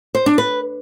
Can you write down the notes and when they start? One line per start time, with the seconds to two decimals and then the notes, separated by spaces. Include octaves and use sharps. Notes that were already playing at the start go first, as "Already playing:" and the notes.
0.15 C5
0.26 D4
0.38 B4